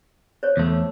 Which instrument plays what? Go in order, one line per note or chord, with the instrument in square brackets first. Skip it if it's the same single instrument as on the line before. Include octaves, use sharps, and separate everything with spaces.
[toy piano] C5 C#5
[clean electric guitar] E2 A3